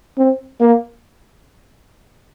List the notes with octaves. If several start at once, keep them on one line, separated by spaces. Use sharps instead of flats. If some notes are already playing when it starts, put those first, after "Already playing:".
C4
A#3